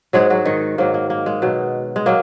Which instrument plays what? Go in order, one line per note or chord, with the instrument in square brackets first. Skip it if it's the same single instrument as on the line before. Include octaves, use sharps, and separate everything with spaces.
[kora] G#2 F#3 G#3 G#4
F#3 F#4
D#3 D#4
G#2 F#3 A#3
A#3
A#3
G#3
B2 F#3
G#3
F#3 A#3